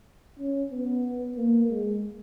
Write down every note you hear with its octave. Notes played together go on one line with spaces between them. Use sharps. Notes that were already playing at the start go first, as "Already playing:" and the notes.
C#4
B3
A#3
G#3